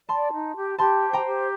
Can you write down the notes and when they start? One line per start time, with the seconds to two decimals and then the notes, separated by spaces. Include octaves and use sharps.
0.09 D5 A5 C6
0.32 D#4
0.55 G4
0.78 G4 A5 C6
1.02 C5
1.13 G5 A#5
1.25 G4